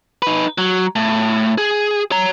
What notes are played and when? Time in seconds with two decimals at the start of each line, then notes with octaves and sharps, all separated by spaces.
0.22 D#4 B4
0.58 F#3
0.96 A2
1.58 G#4
2.12 C#5 A#5